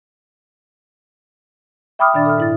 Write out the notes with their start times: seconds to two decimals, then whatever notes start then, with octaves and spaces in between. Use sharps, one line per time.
1.99 E5 G5 B5 D6 D#6 F6
2.14 A#2 D#3 D4 D5 E5 A6
2.25 A4 F6
2.38 G#2 E4 A6